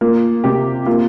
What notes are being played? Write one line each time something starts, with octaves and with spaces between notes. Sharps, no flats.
A#3 F4
C3 G4
A#3 F4